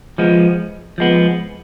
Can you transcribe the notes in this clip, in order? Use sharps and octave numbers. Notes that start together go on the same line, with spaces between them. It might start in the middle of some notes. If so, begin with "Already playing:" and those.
F3 G#3 B3
F3 G#3 B3